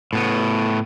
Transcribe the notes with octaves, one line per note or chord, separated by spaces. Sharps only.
A2 B3